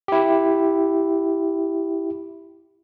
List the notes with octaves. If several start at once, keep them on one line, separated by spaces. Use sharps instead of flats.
E4 G4